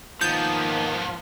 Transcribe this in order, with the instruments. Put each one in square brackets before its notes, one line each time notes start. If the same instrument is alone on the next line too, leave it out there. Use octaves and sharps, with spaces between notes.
[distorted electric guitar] G#2 B3 [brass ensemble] D#3 A#3 [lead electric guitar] F3 [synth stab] G6